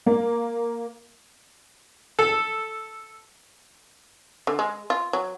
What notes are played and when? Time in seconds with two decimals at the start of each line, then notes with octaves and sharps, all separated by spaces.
0.06 A#3
2.19 A4
4.47 D3
4.59 G#3
4.90 F4
5.13 F#3